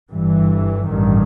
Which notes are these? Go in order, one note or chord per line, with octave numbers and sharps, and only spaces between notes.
G1 G2 E3
A1 G2 D#3